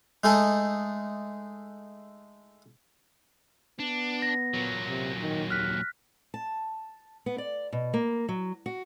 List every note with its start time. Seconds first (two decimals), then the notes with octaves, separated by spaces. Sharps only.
0.24 G#3 A3 D#4 G#4 A4
3.79 B3 D4
4.22 A#6
4.54 A#2 F#3
4.88 C3
5.20 D#3
5.50 D#2 F6 F#6 B6
6.34 A5
7.26 B3
7.38 D5
7.72 B2
7.94 A#3
8.29 F#3
8.66 F#4